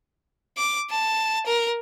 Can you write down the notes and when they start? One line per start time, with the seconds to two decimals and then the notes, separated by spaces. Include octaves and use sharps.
0.58 D6
0.90 A5
1.46 A#4